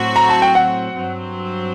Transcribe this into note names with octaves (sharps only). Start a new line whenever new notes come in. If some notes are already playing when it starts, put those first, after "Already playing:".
Already playing: A2 F#3 C4 F#4
A#5
A5
G5
F#5
G2 F#3 C4